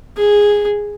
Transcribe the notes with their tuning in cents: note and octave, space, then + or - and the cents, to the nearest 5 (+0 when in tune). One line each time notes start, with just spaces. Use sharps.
G#4 -5